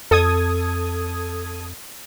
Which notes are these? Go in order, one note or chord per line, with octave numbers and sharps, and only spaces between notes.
F2 A4 D#6 G#6